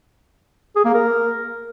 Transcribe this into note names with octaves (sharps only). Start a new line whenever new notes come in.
G#4
A#3
A#4